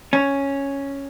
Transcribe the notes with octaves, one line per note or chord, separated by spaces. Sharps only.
C#4